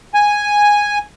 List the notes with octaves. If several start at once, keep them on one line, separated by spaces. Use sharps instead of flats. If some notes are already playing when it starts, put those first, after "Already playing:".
G#5